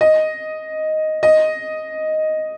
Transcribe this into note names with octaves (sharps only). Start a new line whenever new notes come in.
D#5
D#5